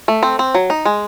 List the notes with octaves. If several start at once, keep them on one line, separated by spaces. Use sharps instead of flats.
A3
C4
C4
F#3
D#4
G#3